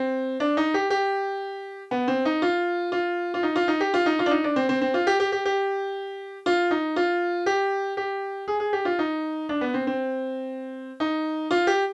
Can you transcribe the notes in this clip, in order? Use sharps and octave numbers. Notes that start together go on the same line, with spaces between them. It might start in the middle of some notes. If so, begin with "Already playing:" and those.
Already playing: C4
D4
D#4
G4
G4
B3
C4
D#4
F4
F4
F4
D#4
F4
D#4
G4
F4
D#4
F4
D4
D#4
D4
C4
C4
C4
F4
G4
G4
G4
G4
F4
D#4
F4
G4
G4
G#4
G#4
G4
F4
D#4
D4
B3
C4
C4
D#4
F4
G4